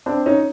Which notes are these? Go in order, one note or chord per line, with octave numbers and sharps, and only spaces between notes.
C4 D4
C#4 D#4